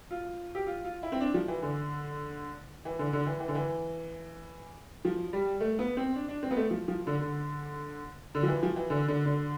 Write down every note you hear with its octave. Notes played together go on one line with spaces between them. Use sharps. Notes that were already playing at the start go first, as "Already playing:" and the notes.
F4
G4
F4
F4
E4
C4
D4
F3
E3
D3
E3
D3
D3
E3
E3
D3
E3
F3
G3
A3
B3
C4
D4
D4
C4
B3
A3
F3
F3
D3
D3
D3
F3
E3
F3
E3
D3
D3
D3